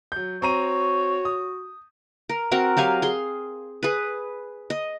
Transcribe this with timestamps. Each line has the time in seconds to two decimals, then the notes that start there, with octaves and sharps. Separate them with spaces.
0.12 F#3 G6
0.42 C4 F#4 C#5 A#5 D#7
1.25 D#6
2.29 A#4
2.51 C4 F#4 A#4
2.77 F#3 G4 F5 G#5
3.02 G#4 C6
3.83 G#4 B4
4.70 D#5